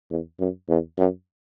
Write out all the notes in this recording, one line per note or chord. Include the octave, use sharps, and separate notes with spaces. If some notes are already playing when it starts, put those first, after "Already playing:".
E2
F#2
E2
F#2